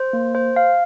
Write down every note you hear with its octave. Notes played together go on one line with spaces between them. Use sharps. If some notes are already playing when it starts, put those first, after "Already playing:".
Already playing: C5
A#3
C5
F5